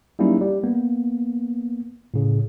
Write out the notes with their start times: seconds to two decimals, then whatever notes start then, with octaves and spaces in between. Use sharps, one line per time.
0.19 F#3 G3 A#3 C#4 D#4 E4
0.41 G3
0.64 A#3 B3
2.14 A2 C#3